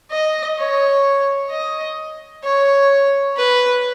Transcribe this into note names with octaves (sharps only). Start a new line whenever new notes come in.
D#5
C#5
D#5
C#5
B4